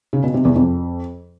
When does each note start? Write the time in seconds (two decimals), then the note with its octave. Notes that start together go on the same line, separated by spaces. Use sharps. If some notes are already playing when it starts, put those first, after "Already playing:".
0.13 C#3
0.24 B2
0.34 C3
0.45 E2
0.55 F2